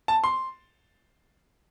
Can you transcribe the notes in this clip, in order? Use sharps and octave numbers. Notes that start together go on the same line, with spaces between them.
A5
C6